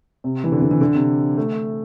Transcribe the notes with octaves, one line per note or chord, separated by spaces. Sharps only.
C3
E3
D3
D3
E3
D3
C3
A3